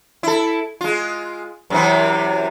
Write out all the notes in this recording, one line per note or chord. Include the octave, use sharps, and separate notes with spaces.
E4 A4
G#3 F4
F#2 C3 E3